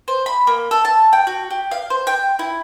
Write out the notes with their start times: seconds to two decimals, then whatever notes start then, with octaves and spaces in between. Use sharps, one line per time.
0.08 C5
0.26 B5
0.47 A#3
0.71 A4
0.85 A5
1.13 G5
1.27 F#4
1.50 G4
1.71 F5
1.90 C5
2.07 G5
2.39 E4